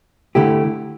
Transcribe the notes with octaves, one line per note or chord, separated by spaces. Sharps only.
D3 A3 E4 G4